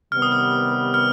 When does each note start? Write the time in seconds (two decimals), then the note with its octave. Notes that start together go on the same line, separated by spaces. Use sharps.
0.12 C3 D#3 G3 B3 F6
0.22 D#6
0.32 F6
0.94 F6